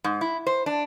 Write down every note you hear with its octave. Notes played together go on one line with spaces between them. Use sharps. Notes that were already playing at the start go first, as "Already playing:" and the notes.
G#2
E4
C5
D4